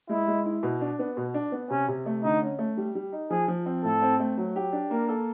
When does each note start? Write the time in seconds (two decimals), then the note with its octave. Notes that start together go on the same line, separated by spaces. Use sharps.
0.09 G#3 E4
0.28 G#3
0.46 E4
0.63 B2
0.81 D4
0.99 B3
1.17 B2
1.34 D4
1.52 B3
1.70 C3 C#4
1.88 C3
2.06 A3
2.24 D3 D#4
2.42 C#4
2.59 A3
2.77 G3
2.95 G3
3.12 D#4
3.30 F3 G#4
3.48 F3
3.66 C4
3.84 A2 A4
4.02 C4
4.20 A3
4.38 F#3
4.56 G4
4.73 D4
4.91 A#3 A#4
5.09 A4